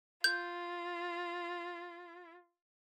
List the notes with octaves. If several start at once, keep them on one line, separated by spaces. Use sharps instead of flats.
F4 G6